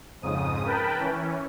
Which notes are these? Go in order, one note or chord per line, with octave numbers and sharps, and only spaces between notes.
F2 G#2 C#3 D#6
A#4 B4 G5 A5 B5
E3 C#4